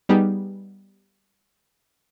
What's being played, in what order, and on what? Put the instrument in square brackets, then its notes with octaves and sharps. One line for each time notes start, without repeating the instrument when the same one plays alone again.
[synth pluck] G3 B3 D#4 G4 G#4